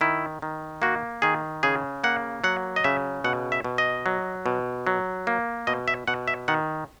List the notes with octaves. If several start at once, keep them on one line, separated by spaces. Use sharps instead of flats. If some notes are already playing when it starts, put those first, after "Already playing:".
D#3 E4
D#3
A#3 F#4
D#3 G#4
C#3 G#4
A#3 F#5
F#3 F#5
D#5
C#3 E5
B2 F#5
E5
B2
D#5
F#3
B2
F#3
A#3
B2 D#5
E5
B2 F#5
E5
D#3 F#5